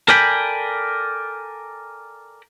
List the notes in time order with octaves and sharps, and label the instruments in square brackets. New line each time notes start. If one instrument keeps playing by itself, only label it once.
[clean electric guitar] A4 A#4 D5 G5 G#5 B5